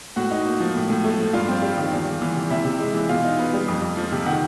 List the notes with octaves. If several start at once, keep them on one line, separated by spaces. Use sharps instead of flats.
A2 F#4 F#5
D#4
A#3
F3
A2
A2
A3
F3
G2 F4 F5
C4
G3
D#3
E2
E2
E3
C3
C3 E4 E5
C3
G#3
E3
B2 F4 F5
D#4
B3
G3
F2
F2
F3
C3
D#3 F#5